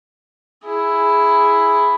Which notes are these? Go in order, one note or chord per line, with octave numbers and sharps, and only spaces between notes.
E4 G#4